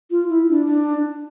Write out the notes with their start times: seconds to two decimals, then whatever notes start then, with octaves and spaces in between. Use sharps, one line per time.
0.11 F4
0.29 E4
0.49 D4
0.66 D4